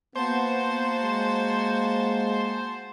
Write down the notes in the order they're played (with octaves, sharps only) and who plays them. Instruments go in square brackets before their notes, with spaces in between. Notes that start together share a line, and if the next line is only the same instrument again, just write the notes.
[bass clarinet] A#3 [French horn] B3 [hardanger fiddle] F#4 A5 [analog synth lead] C5
[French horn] G#3